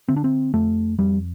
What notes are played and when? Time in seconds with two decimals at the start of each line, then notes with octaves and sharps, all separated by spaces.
0.08 D3 C4
0.16 D4
0.24 C4
0.53 F2 A3
0.98 F2 G3